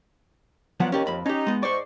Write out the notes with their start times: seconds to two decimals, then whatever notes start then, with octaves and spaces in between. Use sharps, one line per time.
0.80 F3 F#3 B3 F4 D5 F#5
0.92 D#2 C#4 G4 D5
1.07 F2 B5
1.26 C#4 D#4 G4
1.47 G#3 B3
1.63 G#2 C5 D5 C#6